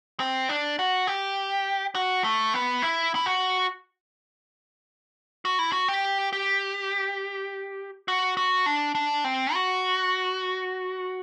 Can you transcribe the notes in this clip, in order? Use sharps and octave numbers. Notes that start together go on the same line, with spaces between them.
C4
D4
F#4
G4
F#4
A3
B3
E4
E4
F#4
F#4
E4
F#4
G4
G4
F#4
F#4
D4
D4
C4
F#4